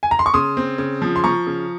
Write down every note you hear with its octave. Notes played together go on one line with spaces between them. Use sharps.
G#5
A#5
C6
C#6
C#3 C6 D#6
C4
C#3
F3
C6
F3 A#5 C#6
C#3